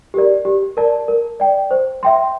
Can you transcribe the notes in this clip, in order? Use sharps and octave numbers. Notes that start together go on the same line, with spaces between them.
G4 A#4 D5
G4
A#4 D5 A5
A#4
D5 G5
C5
E5 G5 C6